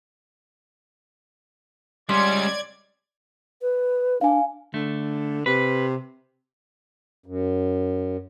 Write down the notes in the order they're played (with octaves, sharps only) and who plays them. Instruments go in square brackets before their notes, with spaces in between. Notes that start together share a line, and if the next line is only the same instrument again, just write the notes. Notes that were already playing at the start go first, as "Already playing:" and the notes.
[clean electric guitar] G3 [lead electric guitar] G#3 C#4 [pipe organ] D5 G#6 [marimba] C6
[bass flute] B4
[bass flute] D4 [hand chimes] F5 G#5
[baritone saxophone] D3 [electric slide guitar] A3
[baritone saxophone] C3 [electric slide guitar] B4
[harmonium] F#2